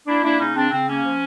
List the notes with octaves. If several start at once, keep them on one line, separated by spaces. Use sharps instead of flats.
A#3 D4 E4
A#3 D4 E4
C#3 C#4 D#4
C#3 C4 D4
C#3 C4
A#3 C#4
F3